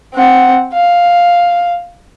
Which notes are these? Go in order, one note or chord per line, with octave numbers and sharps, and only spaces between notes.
C4 F#5
F5